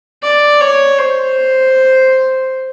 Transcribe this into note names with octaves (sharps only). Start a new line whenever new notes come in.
D5
C#5
C5